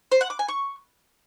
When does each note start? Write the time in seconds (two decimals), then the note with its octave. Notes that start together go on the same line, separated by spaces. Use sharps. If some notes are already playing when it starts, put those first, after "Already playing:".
0.12 C5
0.21 F#5
0.30 D6
0.39 G#5
0.48 C#6